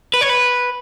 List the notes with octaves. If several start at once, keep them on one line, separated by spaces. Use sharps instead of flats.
B4
C#5
B4